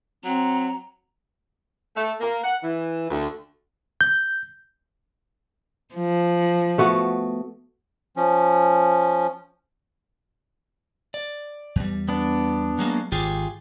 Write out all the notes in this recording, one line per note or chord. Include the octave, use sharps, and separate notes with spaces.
F#3 C4 A#5
A3
A#3
F#5
E3
D2
G6
F3
A3 B3 F#4
F3 C#4
D5
E2 G3
B3 D4
F#3 G#3 A#3
G#1 F4 G4 G#4